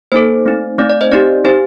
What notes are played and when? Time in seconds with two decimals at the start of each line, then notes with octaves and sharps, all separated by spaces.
0.12 A#3 D#4 A4 C5
0.45 A3 C4 D#4
0.78 A3 C4 D#4 D5
0.90 D5
1.01 C5 D#5
1.12 C4 D#4 G4 D5
1.44 C4 D#4 G4 C5